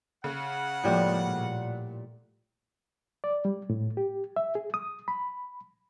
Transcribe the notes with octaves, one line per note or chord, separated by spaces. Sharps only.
C#3 F#5
A2 F3 G3 G#3 A#3
A#2
D5
G3
A2
G4
E5
G#4
D#6
B5